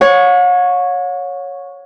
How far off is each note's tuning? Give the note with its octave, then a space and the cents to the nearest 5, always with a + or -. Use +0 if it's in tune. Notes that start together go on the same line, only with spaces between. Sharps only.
C#5 +0 F#5 -45